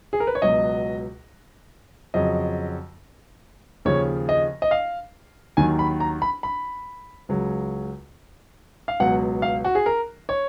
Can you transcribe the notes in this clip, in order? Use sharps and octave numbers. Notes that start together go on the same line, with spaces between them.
G#4
A#4
B4
C#5
C#2 B2 F#3 D#5
F2 C#3 F#3 D#5
D#2 C#3 F3 C#5
D#5
D#5
F5
D#2 D#3 F#3 G#5
B5
A#5
B5
B5
C#2 C#3 F#3
F5
C#2 B2 F#3 F#5
F5
F#4
G#4
A#4
C#5